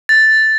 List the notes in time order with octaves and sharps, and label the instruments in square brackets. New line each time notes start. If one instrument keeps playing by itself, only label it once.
[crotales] A6